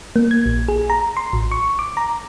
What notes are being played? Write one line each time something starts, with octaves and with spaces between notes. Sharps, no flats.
A#3
G#6
A#1
G#4
A#5
C6
A1
C#6
D6
A#5